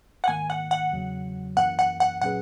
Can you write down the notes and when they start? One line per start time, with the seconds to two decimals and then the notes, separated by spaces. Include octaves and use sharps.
0.24 F#5
0.28 G#2 D#3 A#3 G#5
0.50 F#5
0.71 F#5
0.93 E2 C#3 F#3
1.57 F#2 E3 A#3 F#5
1.79 F#5
2.00 F#5
2.21 A#2 F#3 C#4 G#4 B4 F#5